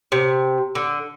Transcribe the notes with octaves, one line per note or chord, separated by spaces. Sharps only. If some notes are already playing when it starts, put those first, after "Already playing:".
C3
D3